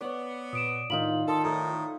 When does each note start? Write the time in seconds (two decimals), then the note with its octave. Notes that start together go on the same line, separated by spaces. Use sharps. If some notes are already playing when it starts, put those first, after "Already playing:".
0.01 B3 C#5 D5
0.53 A#2 D#6 D7 E7
0.90 A2 D#3 D#4 F4 B5 F#7
1.28 D#3 A4 A5 C6 D#6
1.44 A2 F3 E4 A#5 D#6